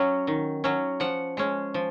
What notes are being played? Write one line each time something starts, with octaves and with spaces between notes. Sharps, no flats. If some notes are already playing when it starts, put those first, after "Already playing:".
Already playing: F#3 C#4
D#3
F#3 C#4
F3 F#5
G#3 C#4
F3